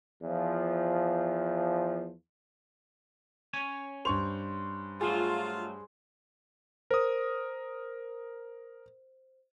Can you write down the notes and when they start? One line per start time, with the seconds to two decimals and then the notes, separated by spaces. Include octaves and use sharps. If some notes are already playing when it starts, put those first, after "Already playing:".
0.22 E2 F3
3.53 C#4 C#5 G#5
4.05 G2 C5 C#6 F7
5.01 F#3 A3 F4 G#4
6.91 A#4 C5 D#6